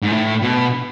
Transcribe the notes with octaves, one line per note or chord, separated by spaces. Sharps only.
G#2
A2
B2